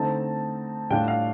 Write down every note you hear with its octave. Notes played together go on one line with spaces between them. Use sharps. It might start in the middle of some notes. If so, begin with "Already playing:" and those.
Already playing: D3 A3 C4 D#4 A5
A2 G3 D4 F4 G5
F5